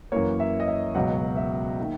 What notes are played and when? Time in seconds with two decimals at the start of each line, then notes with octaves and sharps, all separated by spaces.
0.12 F#2 E3 A#3 C#5
0.40 E5
0.60 D#5
0.68 E5
0.95 C#2 B2 F#3 F#5
1.36 E5
1.80 D#3 A#3